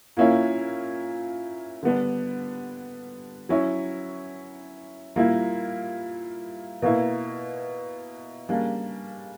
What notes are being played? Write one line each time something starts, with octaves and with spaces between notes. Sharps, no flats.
A#2 A#3 C#4 E4
D3 G3 B3 D4
F#3 C#4 E4
A#2 G3 A#3 E4
B2 A#3 E4
C#3 G3 A#3 D4